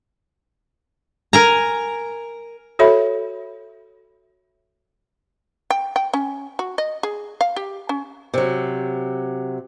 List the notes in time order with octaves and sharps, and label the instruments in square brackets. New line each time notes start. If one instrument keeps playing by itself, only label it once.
[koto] A#4 G#5 A#5
[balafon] F#4 A4 C#5 E5 B5
[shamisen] G5
G5
C#4
F#4
D#5
G#4
F5
G4
C#4
[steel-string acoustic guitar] C3 F#3